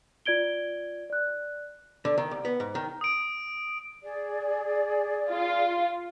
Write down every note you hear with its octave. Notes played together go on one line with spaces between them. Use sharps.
F4 D5 G#6 D7 G7
D5 F#6
D3
D#3
C2
B3
G#2
D#3
D#6 D7
G#4 D5
F4